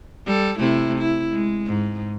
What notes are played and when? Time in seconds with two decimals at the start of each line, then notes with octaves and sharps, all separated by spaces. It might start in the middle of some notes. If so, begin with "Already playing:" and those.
0.26 G3 A4
0.59 C3 A3 E4
0.99 E4
1.32 G#3
1.67 G#2